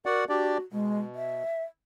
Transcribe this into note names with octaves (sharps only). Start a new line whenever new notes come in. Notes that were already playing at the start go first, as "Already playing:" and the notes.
F#4 A#4 D5 F#5
D4 F#4 G4 D5
B2 G#3
E5